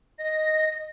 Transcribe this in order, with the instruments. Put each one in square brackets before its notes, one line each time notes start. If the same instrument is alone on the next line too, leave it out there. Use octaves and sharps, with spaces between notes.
[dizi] D#5 [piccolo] A#6